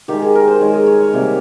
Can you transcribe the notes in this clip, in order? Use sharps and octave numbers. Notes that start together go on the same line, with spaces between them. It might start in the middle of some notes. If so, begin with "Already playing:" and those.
D#3 G#3 G4
G#4
A#4
C5
D#3 G#3 C#5
D#5
C#5
C#5
C3 G3 A#3